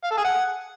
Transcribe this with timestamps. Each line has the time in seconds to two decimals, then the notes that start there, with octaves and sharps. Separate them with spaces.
0.04 F5
0.11 A4
0.18 G#4
0.24 F#5